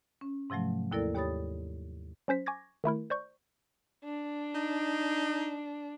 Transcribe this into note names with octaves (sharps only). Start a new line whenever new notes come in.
C#4
G#2 C3 F3 F#3 A3
D#2 A#3 E4 A4 A#4 D5
D#2 G4 C#5 B5 D#6 A6
F#3 C#4 C5 B6
G#5 C#6 D6 G#6 A#6
D#3 A3 E4 A#4
C5 D5 C#6 G6
D4
D#4